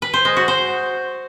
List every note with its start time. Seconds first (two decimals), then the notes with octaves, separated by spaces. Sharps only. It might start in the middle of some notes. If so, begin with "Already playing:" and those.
0.02 B4
0.14 C5
0.25 G#3
0.36 F#4
0.48 C5